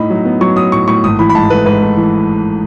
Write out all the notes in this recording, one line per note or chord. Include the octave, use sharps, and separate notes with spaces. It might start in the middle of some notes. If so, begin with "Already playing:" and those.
Already playing: A2 D#4 B5
F#3
B3
F#3 C#6
F#3 D#6
A2 C#6
A2 C#6
G#1 D#6
E3 B5
B5
G#2 A5
A3 B4
G#2 B4
A3
E3